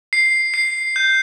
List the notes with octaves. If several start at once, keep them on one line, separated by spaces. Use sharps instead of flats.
C7
C7
G6